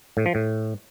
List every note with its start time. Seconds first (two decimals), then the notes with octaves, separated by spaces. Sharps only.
0.17 A2
0.26 F3
0.35 A2